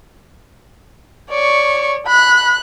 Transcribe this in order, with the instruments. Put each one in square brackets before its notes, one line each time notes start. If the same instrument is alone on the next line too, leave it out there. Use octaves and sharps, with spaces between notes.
[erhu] C#5 [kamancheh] D5 C#6
[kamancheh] B5 [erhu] F#6